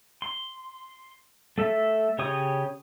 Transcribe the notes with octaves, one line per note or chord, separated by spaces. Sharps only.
C6
A3 A4 E5
C#3 G4 C#5 C#6 D#6